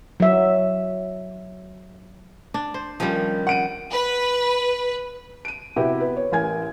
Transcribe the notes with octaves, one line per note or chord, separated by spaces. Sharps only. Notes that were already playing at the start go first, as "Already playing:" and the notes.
F#3 E5
D4
C5
D#3 F3 G3 C#4
F#5 D7 D#7
B4
D7 D#7
C3 B3 E4 F#4 G4
B3
C#5
A1 A#4 G#5 G#6